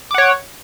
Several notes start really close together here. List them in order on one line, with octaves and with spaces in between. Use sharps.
D6 F#5 C#5